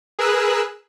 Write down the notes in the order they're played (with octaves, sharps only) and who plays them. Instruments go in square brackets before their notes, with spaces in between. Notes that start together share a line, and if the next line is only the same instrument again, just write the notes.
[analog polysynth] G#4 A#4 B4 E6 F#6